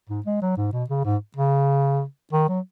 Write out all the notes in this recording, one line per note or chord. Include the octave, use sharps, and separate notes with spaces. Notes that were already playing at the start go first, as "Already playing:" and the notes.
G#2
G#3
F#3
G#2
B2
C#3
G#2
C#3
D#3
F#3